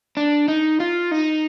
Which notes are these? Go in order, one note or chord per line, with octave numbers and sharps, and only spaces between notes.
D4
D#4
F4
D#4